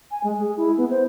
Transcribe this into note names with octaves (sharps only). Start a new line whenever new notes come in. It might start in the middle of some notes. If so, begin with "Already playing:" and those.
G#5
G#3
G#4
E4
B3
C5